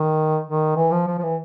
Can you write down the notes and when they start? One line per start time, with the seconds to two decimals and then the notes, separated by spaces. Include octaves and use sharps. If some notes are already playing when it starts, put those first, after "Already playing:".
Already playing: D#3
0.45 D#3
0.76 E3
0.91 F3
1.07 F3
1.18 F3
1.23 E3